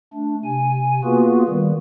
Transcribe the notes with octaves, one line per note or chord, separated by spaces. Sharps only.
A3 D4
C3 G#5
A#3 B3 F4 F#4 G#4 B4
D#3 G3